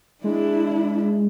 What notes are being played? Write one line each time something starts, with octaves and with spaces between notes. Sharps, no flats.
G#3 D4 E4